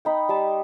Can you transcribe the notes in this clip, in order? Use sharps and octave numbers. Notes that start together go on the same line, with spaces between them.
D#4 G5 B5
G3 A5 C6